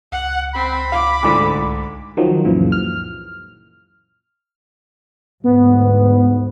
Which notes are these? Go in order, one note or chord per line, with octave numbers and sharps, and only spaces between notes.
C#2 F#5
C4 B5
F5 D6
D2 G#2 D3
C2
D#3 F3 F#3
C#2 F#2 A#2 C#3 E3 F3
F6
D2 G#2 B3